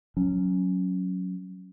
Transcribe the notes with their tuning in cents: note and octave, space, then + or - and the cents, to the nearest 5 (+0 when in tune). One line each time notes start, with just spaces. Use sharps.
F#3 -10 C#4 +0